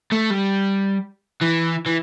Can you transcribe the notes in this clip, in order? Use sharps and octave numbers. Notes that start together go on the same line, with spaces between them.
A3
G3
E3
E3